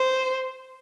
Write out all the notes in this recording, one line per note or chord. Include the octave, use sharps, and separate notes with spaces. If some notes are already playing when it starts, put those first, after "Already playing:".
Already playing: C5